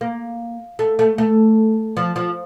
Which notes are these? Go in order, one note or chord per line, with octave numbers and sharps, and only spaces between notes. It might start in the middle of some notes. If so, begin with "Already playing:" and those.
A#3
A3
A3
A3
F3
F3